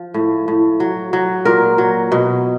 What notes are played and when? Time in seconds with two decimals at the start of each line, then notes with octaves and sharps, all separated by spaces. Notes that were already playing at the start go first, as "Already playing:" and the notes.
Already playing: F3
0.14 A2
0.48 A2
0.80 F#3
1.13 F#3
1.45 A#2 A#4
1.78 F#3
2.12 B2